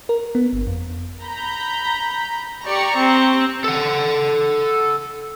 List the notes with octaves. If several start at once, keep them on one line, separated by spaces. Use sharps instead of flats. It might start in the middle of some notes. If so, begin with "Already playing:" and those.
A#4
B3
G1
F2
A#5 B5 G6
G4 D5 A#5 C#6
C4
A4 F#5